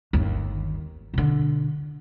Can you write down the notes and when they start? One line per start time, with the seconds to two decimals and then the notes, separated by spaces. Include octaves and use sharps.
0.13 G1 D#2
1.14 B2 D3